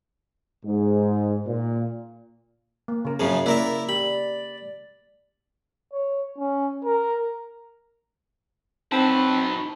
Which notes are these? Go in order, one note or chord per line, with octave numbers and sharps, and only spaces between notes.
G#2
A#2
A#3
C#3 A#4
F#2 C#3 F3 C#4 G#4
A#3 E4 A#4 D5 E5
G4 B5
C#5
C#4
A#4
F#3 C4 D#4 B4 A5